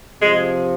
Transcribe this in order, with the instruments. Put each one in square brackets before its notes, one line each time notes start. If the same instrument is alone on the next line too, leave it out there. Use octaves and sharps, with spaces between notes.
[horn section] C3 F3 G#3